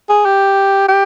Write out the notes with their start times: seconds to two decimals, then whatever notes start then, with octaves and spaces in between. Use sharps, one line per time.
0.09 G#4
0.26 G4
0.88 G4